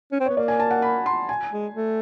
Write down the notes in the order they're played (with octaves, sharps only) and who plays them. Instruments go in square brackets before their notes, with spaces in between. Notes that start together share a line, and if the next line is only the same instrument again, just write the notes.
[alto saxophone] C#4
C4
[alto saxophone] B3 [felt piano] C#5
[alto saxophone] A#3 [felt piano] D5
[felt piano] G#5
A5
F#5
B5
C6
G#5
[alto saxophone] G#3
A3